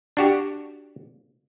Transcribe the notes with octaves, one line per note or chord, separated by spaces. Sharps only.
D4 F#4 G4